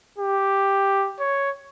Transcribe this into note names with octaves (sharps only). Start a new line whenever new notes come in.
G4
C#5